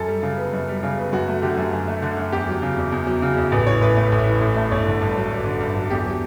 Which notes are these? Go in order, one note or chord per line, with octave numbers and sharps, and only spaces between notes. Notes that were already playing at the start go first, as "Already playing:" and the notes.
Already playing: F#2 A4
G3
C#3
B3
F#2
G3
C#3
B3
F#2 F#4
A3
D3 G4
F#2
F#2
A3
D3
F#2
E2 G4
F#3
C#3
E2
E2
F#3
C#3
E2
A1 B4
E3 C#5
A2 B4
A3
A1
E3
A2
A3
G1 C#5
D3
G2
F#3
G1
D3
G2
F#3
E2 G4
F#3